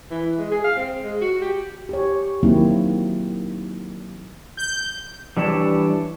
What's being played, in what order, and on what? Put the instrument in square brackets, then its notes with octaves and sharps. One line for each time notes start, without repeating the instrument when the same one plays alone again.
[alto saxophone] E3
G#3
G#4
F5
C4
G#3
F#4
G4
[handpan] G4 C#5
D#3 F#3 A#3 C4 E4
[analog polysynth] G6
[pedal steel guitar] E3 G3 D4 C#5 A5